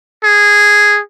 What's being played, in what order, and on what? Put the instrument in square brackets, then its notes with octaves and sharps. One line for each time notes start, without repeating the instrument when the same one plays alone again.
[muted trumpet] G#4